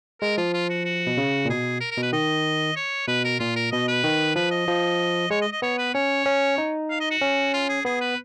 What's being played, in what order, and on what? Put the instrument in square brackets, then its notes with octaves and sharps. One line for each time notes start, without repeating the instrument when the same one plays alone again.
[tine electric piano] G#3 [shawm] A#4
[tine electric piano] F3 [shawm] F4
[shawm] F4
F#4
F#4
[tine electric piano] B2
C#3
A#2
[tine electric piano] B2 [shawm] G#4
[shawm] A#4
A#4
[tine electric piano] B2
[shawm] B4
[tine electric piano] D#3 [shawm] D#5
[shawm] C#5
[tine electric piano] B2 [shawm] B4
[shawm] A#4
[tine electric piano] A#2 [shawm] F4
[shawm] A#4
[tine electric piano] B2 [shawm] D#5
[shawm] B4
[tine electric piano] D#3
[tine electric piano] F3 [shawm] B4
[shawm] D#5
[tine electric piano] F3
[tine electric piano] G#3 [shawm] C#5
[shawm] D#5
D#5
[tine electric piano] B3 [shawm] C#5
[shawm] B4
[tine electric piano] C#4 [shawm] C#5
[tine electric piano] C#4
D#4
[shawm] F5
D#5
F#4
[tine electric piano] C#4
[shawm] F4
G#4
[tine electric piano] B3 [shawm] G#4
[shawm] B4